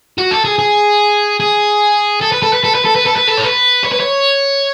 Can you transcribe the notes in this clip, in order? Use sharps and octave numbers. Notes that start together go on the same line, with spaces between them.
F#4
A4
G#4
G#4
G#4
A4
B4
A4
B4
A4
B4
A4
B4
A4
B4
A4
C#5
B4
C#5
B4
C#5